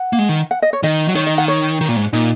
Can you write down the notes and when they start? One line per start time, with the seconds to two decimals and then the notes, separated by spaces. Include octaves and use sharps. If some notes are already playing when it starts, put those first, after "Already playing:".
Already playing: F#5
0.13 A#3
0.19 G#3
0.29 D#3
0.51 F#5
0.62 D#5
0.73 C#5
0.83 D#3 D#5
1.08 F#3
1.15 D#3 C#5
1.26 D#5
1.38 F#5
1.48 C#5
1.81 D#3
1.88 A#2
1.96 G#2
2.13 A#2 D#4